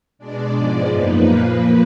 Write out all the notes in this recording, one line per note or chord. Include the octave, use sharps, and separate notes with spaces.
B2 G#3 D4 D5
G#2 F3 G#3 B3
F#2 F3 A#3 D#4 B4
A#2 F3 A#3